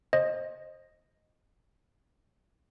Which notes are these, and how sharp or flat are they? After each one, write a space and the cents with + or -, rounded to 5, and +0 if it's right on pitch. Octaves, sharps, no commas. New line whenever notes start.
C5 +25 D#5 -5